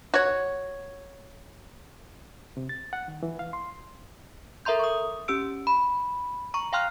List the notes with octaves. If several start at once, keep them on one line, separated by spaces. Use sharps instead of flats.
F#4 C#5
C3
A6
F#5
D#3
E3
F5
C6
A4 A#4 E5 A#5 C6 G6
C#6 D#6
C#4 G4 E6 D7
B5
A#5 C#6
F5 G5 C6 F6 F#6